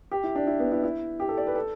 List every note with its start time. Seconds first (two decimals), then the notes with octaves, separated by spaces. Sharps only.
0.11 G4
0.24 E4
0.35 D4
0.47 E4
0.59 B3
0.72 E4
0.83 E4
1.20 G4
1.29 A4
1.38 D5
1.47 B4
1.56 A4